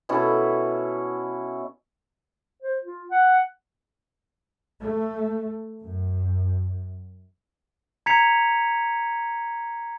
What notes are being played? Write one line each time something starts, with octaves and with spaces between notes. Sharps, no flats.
B2 C#4 E4 A4
C5
F4
F#5
A3
F#2
A#5 G#6 B6 C#7 F7